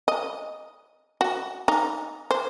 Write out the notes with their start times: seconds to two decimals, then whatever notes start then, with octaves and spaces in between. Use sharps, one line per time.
0.08 D#5
1.21 F#4
1.68 D#4
2.31 C5